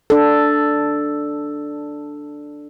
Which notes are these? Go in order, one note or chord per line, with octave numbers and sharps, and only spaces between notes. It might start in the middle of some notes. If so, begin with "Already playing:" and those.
D4 A4